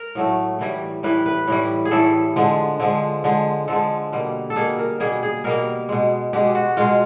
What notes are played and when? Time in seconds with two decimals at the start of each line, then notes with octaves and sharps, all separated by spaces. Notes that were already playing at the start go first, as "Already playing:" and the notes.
Already playing: A#4
0.15 A2 F#3 A3
0.59 A2 E3 G3
1.03 A2 E3 G3 B4
1.26 B4
1.48 A2 E3 G3
1.85 G#4
1.91 A2 E3 G3 A4
2.36 D3 F3 G#3
2.80 D3 F3 G#3
3.24 D3 F3 G#3
3.68 D3 F3 G#3 A4
4.13 B2 G3 A#3
4.50 A4
4.56 B2 G3 A#3 G#4
4.78 A#4
5.00 B2 G3 A#3 G#4
5.23 G#4
5.44 B2 G3 A#3 A#4
5.89 B2 G#3
6.33 B2 G#3 G4
6.55 F#4
6.77 B2 G#3 F4